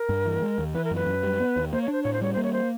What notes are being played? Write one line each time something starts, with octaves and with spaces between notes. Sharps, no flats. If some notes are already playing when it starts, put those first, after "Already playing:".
Already playing: A#4
G2
E3
G#3
D#2
E3 B4
A#4
F#2 B4
F#2
G3
B3
D#2
A#3 C5
C#5
D4 C5
A2 C#5
C5
G3 C#5
A#3 C5
C#5
C5